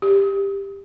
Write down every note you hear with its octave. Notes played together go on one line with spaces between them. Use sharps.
G4